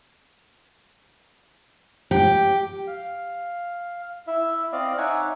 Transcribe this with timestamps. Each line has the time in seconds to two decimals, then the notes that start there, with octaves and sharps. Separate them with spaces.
2.11 G4
2.87 F5
4.27 E4 E5
4.73 C4 D5 D#5 F5
4.98 D#4 C#5 E5 F#5 G#5 D6